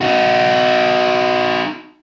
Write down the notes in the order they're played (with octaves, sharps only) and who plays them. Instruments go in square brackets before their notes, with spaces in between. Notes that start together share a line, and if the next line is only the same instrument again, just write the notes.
[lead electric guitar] D#4 F#4